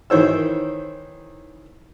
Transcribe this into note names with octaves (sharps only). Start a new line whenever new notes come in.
D#3 E3 C5 C#5 E6